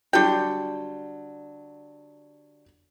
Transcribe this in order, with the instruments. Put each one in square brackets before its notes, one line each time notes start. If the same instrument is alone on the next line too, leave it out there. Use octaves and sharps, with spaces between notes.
[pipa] D3 G5 [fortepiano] F#3 G3